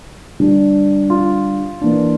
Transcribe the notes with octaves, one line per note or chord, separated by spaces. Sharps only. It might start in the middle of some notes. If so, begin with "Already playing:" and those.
D3 G3 D4
F4
E3 A#3 D4